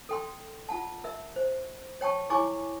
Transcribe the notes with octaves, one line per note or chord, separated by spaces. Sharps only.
A4 G5 C6
F4 F#5 A5
A#4 E5
C5
C#5 G5 A5 C#6
E4 G#4 C#5 G#5 C#6 D6